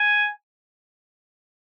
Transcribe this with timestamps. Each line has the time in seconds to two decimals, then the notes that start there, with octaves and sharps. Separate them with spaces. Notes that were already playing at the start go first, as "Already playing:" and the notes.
Already playing: G#5